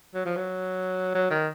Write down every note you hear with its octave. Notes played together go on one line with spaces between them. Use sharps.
F#3
F3
F#3
F#3
D#3